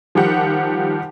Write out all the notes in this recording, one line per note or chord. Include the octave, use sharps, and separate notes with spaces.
D#3 F3 G3 G4 F#5